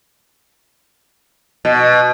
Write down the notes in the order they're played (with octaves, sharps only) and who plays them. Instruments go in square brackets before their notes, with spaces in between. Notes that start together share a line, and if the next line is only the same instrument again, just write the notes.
[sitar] B2